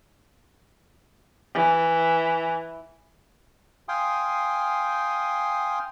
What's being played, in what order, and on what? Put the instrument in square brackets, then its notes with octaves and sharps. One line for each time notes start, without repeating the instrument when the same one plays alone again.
[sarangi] E3
[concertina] F5 G5 G#5 C6 D#6